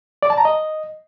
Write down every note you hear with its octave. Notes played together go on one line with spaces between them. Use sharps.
D5
A5
A#5
D#5